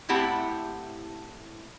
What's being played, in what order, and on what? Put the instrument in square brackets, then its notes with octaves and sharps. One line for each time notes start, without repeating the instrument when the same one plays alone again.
[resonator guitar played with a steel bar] A2 C4 E4 G4 F#5 A5